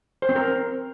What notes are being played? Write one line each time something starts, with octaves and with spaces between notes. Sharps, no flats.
C5
C4
A#4